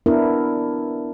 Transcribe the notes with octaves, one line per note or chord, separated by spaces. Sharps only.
B3 D4 E4 A#4